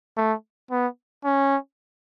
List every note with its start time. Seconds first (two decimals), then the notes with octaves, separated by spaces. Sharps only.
0.17 A3
0.71 B3
1.24 C#4